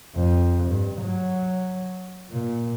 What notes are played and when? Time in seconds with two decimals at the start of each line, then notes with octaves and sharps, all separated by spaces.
0.16 F2
0.69 G2
1.01 F#3
2.31 A#2